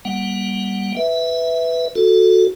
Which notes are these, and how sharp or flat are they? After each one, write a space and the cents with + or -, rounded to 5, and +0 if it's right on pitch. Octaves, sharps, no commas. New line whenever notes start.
G3 +0 A#3 +40 F#5 +0
B4 +5 E5 -5
F#4 -10 A4 +0